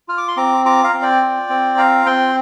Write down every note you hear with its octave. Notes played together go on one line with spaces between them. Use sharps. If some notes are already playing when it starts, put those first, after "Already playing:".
F4 F6
D6
C6
C4 A#5 D6
F4 A#5 D6
F5 A#5
C4
D5 G5
F4
C4
F4 F5 A#5
C4 G5 C6